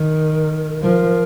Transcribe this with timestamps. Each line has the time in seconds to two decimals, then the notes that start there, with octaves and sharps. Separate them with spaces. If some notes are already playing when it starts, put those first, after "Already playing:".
Already playing: D#3 A#4
0.82 F3 A#4